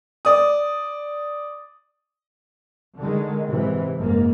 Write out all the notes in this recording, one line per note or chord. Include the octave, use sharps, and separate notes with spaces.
D5 D#6
D3 D#3 G#3
G#2 C3 E3
F#1 G#2 A#3